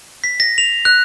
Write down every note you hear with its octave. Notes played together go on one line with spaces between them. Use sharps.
B6
A#6
F7
F#6